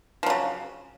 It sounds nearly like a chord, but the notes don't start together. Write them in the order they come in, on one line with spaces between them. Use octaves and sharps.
F3 F#3 C#3